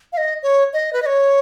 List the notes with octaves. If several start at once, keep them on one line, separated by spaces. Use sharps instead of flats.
F5
D#5
C#5
D#5
B4
D#5
C#5